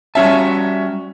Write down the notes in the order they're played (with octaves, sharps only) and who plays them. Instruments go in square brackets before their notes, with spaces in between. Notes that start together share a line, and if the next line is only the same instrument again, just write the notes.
[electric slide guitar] G3 F#4 A5 [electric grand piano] C#4 E5